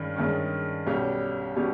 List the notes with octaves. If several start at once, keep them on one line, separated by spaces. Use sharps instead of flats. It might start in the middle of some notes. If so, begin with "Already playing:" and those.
Already playing: G2 D#3 G#3 C#4
G2 D#3 G#3 C#4
B1 B2 G3 C#4 G4
B2 G3 C#4 G4